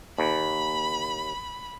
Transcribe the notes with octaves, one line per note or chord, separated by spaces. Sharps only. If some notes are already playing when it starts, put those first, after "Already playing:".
D#2 B5